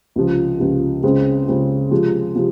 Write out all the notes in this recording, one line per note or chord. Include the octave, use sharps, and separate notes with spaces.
C#2 C3 F3
C#2 C3 F3
C#2 C#3 G#3 C4
C#2 C#3 G#3 C4
C3 F3 G#3
C3 F3